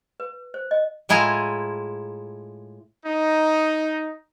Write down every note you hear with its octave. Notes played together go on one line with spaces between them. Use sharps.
B4
C5
D#5
A2 G#3 E4 F4 G#4 A#5
D#4